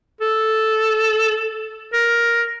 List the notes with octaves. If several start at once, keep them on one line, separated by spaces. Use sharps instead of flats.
A4
A#4